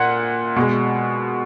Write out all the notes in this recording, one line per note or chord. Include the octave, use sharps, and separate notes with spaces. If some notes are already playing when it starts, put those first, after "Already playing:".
Already playing: A#2 F#5
B2 G#3